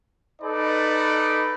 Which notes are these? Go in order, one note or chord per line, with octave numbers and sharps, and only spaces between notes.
D#4 A4 B4 D5